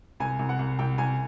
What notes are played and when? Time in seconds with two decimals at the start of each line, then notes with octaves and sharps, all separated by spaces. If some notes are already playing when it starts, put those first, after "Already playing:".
0.20 C2 G#5
0.39 C2
0.49 F#5
0.59 C2
0.79 C2 G5
0.98 C2 G#5